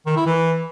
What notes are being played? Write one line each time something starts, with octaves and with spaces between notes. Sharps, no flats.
D#3
E4
E3